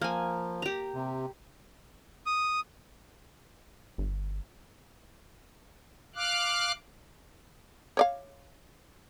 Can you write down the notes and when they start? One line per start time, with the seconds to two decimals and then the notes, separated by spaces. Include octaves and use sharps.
0.01 F3 A#3 G#5
0.62 G4 A#5
0.94 C3
2.26 D#6
3.98 G1
6.16 F5 D6 F6 F#6
7.97 C#5 D5 F5